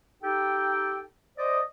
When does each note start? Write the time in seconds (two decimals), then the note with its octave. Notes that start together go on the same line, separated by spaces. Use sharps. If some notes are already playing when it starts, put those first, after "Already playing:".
0.22 D#4 G4 A4 G5
1.37 C5 D5 D#5